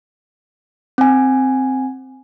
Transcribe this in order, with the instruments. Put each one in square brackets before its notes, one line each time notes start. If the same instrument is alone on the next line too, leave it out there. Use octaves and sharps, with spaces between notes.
[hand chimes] C4 G#5